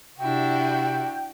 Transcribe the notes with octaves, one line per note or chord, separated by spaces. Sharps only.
C3 D4 E4 F#4 G5